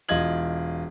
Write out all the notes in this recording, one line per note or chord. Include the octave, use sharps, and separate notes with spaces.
E1 F4 D#5 G#6 F#7